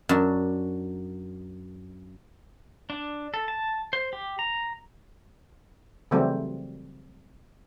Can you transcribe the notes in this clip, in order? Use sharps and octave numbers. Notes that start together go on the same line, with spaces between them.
F#2 D4
D4
A4
A5
C5
G4
A#5
C#3 E3 F#3 G3 A3 C4